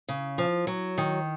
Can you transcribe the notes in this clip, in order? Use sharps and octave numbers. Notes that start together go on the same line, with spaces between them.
C#3
F3
F#3
D#3